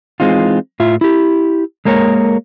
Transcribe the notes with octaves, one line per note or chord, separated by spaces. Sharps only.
E3 G#3 C4 D#4 F4
A2 F4 E5
E4 G4
G#3 A#3 A#4 C#5